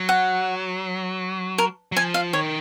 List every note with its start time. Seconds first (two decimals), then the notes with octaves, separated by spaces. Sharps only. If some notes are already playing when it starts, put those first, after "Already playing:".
Already playing: F#3
0.09 F#5
1.58 A#4
1.92 F#3
1.96 F3 G#5
2.14 F5
2.33 D#3 C#5